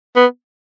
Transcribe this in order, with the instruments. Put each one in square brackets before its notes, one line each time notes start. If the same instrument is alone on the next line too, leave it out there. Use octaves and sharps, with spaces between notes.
[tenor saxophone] B3